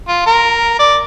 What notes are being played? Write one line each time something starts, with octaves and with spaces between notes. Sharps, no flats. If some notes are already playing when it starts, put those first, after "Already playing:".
F4
A#4
D5